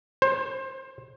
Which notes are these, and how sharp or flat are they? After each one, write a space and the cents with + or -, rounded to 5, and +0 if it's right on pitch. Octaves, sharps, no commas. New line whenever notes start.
C5 +25